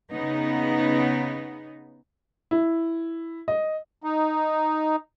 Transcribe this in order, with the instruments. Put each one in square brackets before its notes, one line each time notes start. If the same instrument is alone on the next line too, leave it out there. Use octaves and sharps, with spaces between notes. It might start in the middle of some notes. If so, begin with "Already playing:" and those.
[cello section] C#3 B3 D#4
[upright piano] E4
D#5
[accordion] D#4